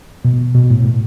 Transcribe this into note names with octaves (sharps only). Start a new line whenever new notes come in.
B2
B2
A2
A2